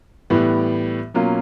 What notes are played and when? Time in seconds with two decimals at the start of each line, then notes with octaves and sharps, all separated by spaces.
0.30 A2 E3 G3 B3
1.14 B2 F#3 A#3 C#4 F4